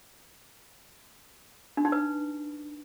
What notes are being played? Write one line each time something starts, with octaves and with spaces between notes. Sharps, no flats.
D4
D#4
B4